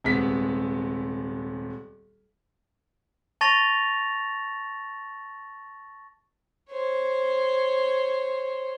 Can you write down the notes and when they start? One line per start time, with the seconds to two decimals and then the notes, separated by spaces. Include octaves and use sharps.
0.04 D#1 C3 G#3 B3 B6
3.41 A5 C#6 A6 A#6 F7
6.71 C5 C#5